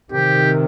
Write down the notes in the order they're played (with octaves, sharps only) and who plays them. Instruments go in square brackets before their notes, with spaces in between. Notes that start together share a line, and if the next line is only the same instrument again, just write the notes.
[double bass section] C3 D#3 [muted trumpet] G4